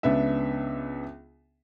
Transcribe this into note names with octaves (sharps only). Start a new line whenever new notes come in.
C#2 B3 D4 E5